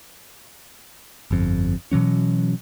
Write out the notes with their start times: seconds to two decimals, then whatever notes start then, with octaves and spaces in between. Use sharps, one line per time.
1.31 G1 F2
1.92 B2 E3 F#3 C#4